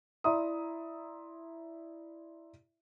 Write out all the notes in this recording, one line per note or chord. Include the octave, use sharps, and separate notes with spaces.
E4 D5 E5 A#5 C6 D#6